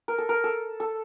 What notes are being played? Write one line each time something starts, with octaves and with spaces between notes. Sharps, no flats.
A#4
A4
A#4
A4
A4